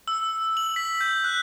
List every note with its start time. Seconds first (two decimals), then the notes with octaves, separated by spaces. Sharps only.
0.08 E6
0.57 F#7
0.76 B6
1.01 G6
1.24 F#6